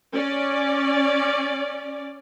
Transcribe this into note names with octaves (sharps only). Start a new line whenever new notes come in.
C#4 D5